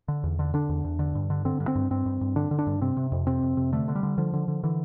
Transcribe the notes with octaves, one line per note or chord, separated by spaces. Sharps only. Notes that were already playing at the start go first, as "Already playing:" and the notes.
D3
E2
D3
D3 D4
E2
E2
D3
G2
D3
D3 C4
G2
C4
G2
G2 C4
G2
G2
D3 D4
D3
D4
G2
C3 C4
C3
F2
C3 C4
F2
C3
D3 A3
D3
G3
D3
D3 F3
D3
D3
D3 E3